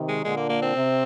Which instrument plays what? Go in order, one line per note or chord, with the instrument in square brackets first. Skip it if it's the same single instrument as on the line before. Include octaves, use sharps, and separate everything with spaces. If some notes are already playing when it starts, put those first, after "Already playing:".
Already playing: [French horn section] C3 D#3
[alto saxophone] G#3
[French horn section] A#2 D3 [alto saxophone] G#3
[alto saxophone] A#3
A#3
C4
[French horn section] C3